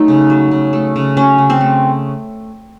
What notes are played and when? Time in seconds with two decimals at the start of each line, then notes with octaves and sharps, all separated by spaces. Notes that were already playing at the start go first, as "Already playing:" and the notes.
Already playing: F#3 A3 D#4
0.08 C#3
0.30 F#3
0.51 C#3
0.73 A3
0.96 C#3
1.17 F#3 C#4
1.38 C#3
1.50 C4
1.61 A3